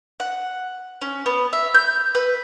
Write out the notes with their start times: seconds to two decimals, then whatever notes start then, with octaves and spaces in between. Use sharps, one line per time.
0.20 F#5
1.02 C#4
1.26 B3
1.53 E5
1.74 G6
2.15 B4